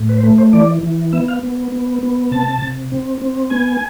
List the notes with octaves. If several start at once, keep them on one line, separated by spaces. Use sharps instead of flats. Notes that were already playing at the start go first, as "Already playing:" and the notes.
Already playing: A2
B4
C5
A3 B4
C5
E3 D5
E3
B3 E5
F5
B3
B3
B3
C3 A5
C3
C4
C4
B3 G#5